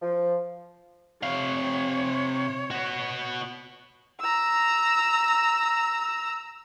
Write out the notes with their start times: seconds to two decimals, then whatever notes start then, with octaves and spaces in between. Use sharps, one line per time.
0.02 F3
1.23 C3 C#5 F5
2.71 B3 F#4
4.21 A#5 E6